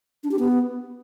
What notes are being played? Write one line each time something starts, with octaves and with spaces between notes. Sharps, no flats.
D4
G4
B3